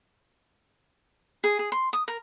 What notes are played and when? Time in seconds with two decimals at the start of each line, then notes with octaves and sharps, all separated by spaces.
1.44 G#4
1.59 G#4
1.72 C6
1.93 D#6
2.08 A#4